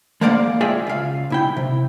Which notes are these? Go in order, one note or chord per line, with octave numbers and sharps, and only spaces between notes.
G#3 A#3 C5 D5 F5 F#5
F4 G#4 D5 E5 G5 G#5
C#2 F5
B1 E4 G5
C3